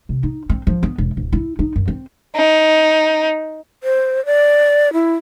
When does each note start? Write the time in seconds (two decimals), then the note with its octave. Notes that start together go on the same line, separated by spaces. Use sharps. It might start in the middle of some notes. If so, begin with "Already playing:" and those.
0.09 C3
0.23 D#4
0.50 C4
0.67 F3
0.83 B3
0.98 E1
1.17 D1
1.33 E4
1.59 D#4
1.76 F#2
1.88 C4
2.36 D#4
3.83 C5
4.26 D5
4.93 E4